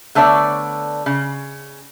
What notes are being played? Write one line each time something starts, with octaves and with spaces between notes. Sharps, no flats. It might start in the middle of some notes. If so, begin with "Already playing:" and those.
D3 A3 B3 C#5 D5
C#3